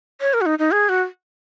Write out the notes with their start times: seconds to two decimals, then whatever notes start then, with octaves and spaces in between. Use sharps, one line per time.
0.21 C#5
0.34 A#4
0.41 F#4
0.46 D#4
0.59 D#4
0.72 G#4
0.89 F#4